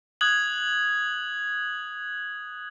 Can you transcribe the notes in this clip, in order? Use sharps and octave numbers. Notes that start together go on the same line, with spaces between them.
D#6 F#6 G#6 F#7